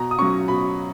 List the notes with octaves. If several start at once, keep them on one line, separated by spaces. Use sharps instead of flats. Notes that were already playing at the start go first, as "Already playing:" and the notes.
Already playing: B2 A#5
D#6
F#3 C#4 C#6
B2 B5